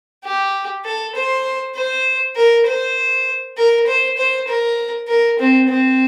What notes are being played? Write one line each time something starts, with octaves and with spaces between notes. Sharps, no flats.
G4
A4
C5
C5
A#4
C5
A#4
C5
C5
A#4
A#4
C4
C4